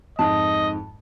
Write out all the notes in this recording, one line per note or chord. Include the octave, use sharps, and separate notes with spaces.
F2 G#2 D#5 A5